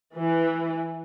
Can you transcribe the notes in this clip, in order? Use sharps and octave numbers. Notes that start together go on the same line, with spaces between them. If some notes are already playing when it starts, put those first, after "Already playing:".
E3